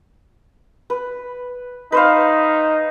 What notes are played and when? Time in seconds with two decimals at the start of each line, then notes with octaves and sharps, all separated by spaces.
0.90 B4
1.92 D#4 B4 C5 F5